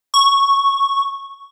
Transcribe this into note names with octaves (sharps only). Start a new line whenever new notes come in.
C#6